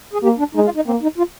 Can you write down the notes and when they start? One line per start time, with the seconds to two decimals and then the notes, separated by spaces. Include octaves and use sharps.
0.13 G#4
0.23 A#3 G4
0.39 D4
0.55 G#3 D#4
0.65 F4
0.76 D#4
0.87 A#3 C4
1.03 D#4
1.18 F4